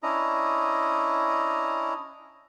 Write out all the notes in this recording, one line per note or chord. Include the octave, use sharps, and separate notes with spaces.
C#4 D4 E4 D#5 A#5